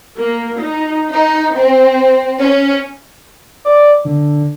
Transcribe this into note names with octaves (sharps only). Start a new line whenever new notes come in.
A#3
D#4
D#4
C4
C#4
D5
D3